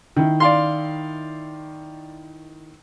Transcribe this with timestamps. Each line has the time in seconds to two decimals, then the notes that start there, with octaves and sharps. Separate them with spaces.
0.16 D#3 E4
0.40 D5 F5 C6